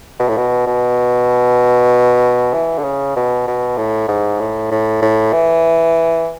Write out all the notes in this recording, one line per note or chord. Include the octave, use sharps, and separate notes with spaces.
B2
A2
B2
B2
E3
D3
C#3
B2
B2
A2
G#2
A2
A2
A2
E3